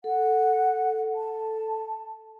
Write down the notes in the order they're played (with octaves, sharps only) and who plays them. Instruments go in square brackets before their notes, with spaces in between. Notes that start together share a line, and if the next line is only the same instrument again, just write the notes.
[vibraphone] A4 [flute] F#5
[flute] A5